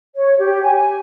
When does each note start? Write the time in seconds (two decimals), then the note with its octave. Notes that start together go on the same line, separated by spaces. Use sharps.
0.15 C#5
0.39 G4
0.62 G#5
0.76 G#5